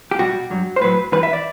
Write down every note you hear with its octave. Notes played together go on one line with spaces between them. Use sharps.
G4
B2 G3 F#4
G2 F#3
C5
A2 F#3 B4
G2 E3 G3 B4
E5
D5